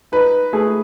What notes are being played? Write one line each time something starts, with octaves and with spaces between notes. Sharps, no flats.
D#4 B4
A3 G#4